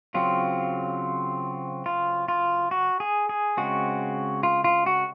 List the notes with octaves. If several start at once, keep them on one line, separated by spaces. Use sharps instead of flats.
C#3 F#3 C4 F4
F4
F4
F#4
G#4
G#4
C#3 G#3 C4 F#4
F4
F4
F#4